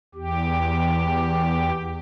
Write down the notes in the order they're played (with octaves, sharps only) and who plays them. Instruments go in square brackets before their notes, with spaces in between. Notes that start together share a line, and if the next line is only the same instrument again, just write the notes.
[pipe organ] E2 G4